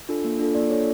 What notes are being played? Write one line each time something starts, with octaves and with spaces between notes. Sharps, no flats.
D4 F4 A4
A#3
D4 F4 A4
A#3 D5
D4 F4 A4 C#5